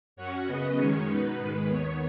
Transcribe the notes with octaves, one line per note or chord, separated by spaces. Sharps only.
F#2 F#3 C#4 C#5 F#5
F#2 C#3 B3 B4 D#5
F#2 D#3 G#3 C#4 C#5
B2 B3 D#4 B4
G#2 D#3 G#3
D#2 D#3 B3 C#5